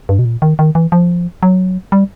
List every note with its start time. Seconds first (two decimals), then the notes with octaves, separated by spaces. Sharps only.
0.09 G2
0.19 B2
0.25 A#2
0.42 D#3
0.59 D#3
0.75 E3
0.92 F3
1.43 F#3
1.92 G3